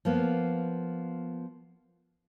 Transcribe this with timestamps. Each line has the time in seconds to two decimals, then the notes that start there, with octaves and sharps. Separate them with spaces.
0.05 F3 A#3 B3